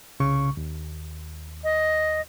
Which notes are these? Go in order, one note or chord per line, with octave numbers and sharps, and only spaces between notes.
C2 C#3 C#6
D#2
D#5